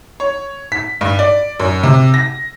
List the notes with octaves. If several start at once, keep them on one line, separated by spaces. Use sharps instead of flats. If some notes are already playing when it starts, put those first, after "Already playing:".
C#5
B6
G2
D5
F#2
C3
A#6